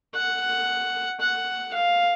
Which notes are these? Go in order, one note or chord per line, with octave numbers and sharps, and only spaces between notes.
F#5
F#5
F5